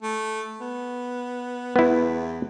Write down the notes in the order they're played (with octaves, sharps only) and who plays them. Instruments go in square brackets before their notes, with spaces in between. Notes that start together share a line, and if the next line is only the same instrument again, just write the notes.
[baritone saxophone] A3
B3
[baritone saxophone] E2 [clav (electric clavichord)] B3 E4